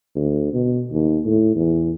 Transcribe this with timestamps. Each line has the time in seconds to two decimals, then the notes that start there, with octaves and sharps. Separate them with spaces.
0.15 D2
0.53 B2
0.91 D#2
1.25 A2
1.56 E2